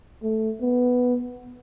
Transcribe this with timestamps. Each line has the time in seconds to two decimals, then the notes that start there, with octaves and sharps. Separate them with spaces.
0.23 A3
0.61 B3